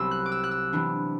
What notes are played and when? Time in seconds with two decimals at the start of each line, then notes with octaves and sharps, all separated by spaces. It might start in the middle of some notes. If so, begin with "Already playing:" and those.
Already playing: C2 C3 F#3 B3 E6
0.11 F#6
0.26 D6
0.32 E6
0.44 F#6
0.51 E6
0.73 C3 E3 B3 D4